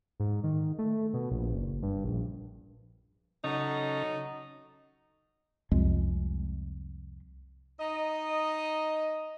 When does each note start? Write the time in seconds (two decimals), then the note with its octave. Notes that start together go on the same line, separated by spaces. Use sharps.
0.20 G#2
0.44 D#3
0.79 A3
1.14 B2
1.31 A#1
1.53 F#1
1.83 G2
2.04 A#1
3.44 C#3 F#3 C#4 D#4 A4
5.71 C2 F2 G#3
7.80 D#4 D#5